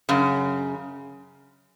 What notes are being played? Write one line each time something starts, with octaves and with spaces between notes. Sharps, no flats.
F#2 C#3